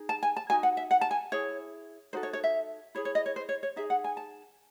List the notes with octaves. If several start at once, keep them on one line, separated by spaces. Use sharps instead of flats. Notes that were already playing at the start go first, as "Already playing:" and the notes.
Already playing: D#4 G#4
A5
G#5
A5
D#4 F#4 G#5
F#5
E5
F#5
A5
G#5
E4 G#4 C#5
D#4 F#4 A4 C5
C#5
C#5
E5
E4 G#4 C#5
C#5
D#5
C#5
C5
C#5
C#5
D#4 G#4 E5
F#5
G#5
A5